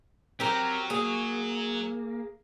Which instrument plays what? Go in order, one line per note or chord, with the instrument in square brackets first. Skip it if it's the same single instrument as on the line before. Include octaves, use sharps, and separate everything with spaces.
[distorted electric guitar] F#3 [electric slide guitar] C4 [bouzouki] G4 A#4
[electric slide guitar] A#3 [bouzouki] G#4